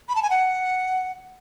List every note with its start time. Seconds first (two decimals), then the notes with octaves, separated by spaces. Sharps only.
0.09 B5
0.16 A5
0.23 G#5
0.30 F#5